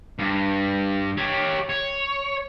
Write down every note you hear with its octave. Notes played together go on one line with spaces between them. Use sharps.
G2
G4 C#5
C#5